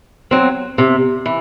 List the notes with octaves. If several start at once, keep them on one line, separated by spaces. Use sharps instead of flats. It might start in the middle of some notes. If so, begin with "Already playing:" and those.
F#3 C4
C3
E3